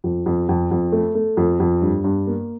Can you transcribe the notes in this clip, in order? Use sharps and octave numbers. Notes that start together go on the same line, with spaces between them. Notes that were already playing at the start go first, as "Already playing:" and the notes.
F2
F2
F2
F2
A3
A3
F2
F2
G2
G2
A#3